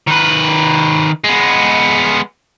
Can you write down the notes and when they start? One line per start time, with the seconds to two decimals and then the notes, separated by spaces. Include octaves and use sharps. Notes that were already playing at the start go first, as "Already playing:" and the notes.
0.07 D#3 B4
1.24 G#3 B3